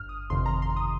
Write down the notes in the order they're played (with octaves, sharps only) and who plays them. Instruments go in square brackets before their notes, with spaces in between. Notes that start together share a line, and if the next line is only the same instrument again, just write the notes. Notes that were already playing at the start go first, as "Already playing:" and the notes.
Already playing: [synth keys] G1 G2 F6
D#6
G1 F2 C3 D#3 C6
A#5
C6
D#6